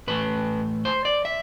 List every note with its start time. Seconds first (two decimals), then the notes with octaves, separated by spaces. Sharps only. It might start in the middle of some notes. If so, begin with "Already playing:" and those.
0.07 A2 E3 A3 B4
0.85 C5
1.05 D5
1.25 E5